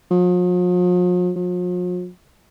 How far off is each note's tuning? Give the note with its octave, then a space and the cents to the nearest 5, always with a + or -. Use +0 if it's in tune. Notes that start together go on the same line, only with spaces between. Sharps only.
F3 +45
F3 +45